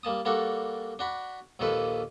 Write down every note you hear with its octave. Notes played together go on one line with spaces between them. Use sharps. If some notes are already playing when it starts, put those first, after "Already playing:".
G3 A#3 A5 D#6
G3 A#3 D4 F#4 A4
D4 F#4 B5
A#1 D#2 D#3 A#3 A4 B4